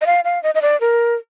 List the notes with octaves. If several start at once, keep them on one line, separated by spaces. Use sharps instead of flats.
D#5
F5
F5
D#5
D#5
D5
A#4